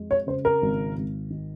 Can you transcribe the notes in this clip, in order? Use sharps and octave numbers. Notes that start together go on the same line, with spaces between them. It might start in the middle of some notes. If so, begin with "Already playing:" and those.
Already playing: F2 G#3
C#5
C#3 C5
A#4
G#1
G#1
D#3